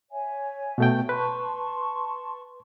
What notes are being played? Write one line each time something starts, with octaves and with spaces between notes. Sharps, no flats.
C#5 E5 G#5
B2 A3 G5
B4 A5 C6 C#6